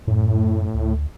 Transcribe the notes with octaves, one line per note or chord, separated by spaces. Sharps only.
F#2 A2
D2